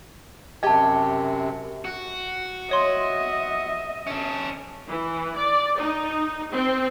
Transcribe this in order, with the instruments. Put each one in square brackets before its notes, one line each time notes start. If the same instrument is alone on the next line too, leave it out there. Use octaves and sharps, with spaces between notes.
[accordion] F#2 C3 [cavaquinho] G4 G#5 [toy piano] D#5 A5
[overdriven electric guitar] F#4
[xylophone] C#5 C6 [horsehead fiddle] D#5 E5
[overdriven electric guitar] C#4 A4
[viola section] E3
D5
D#4
C4